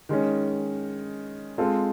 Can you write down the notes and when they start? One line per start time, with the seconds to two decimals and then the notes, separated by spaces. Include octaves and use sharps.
0.09 D#3 G#3 C#4
1.58 G#3 C4 F4 A4